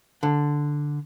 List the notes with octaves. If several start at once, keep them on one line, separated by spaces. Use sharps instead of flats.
D3